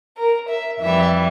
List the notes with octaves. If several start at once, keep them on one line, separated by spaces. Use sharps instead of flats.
A#4
E5
F2 E3 G3 E5